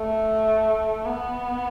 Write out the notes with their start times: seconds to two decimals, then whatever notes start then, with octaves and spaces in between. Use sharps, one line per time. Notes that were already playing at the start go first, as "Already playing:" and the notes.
Already playing: A3
1.05 B3